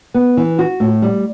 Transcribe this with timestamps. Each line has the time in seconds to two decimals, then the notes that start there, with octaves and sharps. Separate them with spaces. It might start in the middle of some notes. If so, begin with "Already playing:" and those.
0.14 B3
0.37 E3
0.59 F#4
0.80 A2
1.02 G3